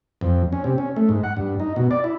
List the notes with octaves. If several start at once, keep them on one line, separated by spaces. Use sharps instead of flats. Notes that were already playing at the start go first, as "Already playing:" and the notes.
F2
C#4
C3
C#4
A3
G#2
F#5
G2
D#4
B2
D5
E4